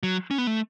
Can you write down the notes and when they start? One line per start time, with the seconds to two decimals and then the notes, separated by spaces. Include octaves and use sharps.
0.03 F#3
0.31 C#4
0.38 B3
0.47 A3